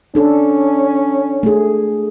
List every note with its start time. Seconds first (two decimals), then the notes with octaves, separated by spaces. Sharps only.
0.15 C#4 D4 A4
1.43 A3 G#4